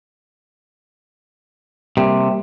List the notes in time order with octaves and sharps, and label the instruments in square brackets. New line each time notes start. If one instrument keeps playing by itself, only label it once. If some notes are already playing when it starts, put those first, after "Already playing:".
[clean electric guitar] C3 [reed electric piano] G3 A#3 G4